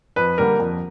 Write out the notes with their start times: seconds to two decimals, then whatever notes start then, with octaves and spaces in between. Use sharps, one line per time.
0.16 F2 B4
0.38 D3 G3 A#3 A#4
0.59 F2